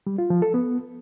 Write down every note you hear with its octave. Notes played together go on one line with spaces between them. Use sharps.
G3
F4
F3
A4
B3